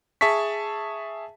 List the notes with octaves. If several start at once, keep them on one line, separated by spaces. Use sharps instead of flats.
G#4 E5 A5 C#6 B6